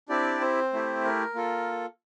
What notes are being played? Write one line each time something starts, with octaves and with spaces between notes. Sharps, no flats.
C4 D4 E4 G4 D5
C4 C5
A3 E4 G4
A#4
A#3 F4 A4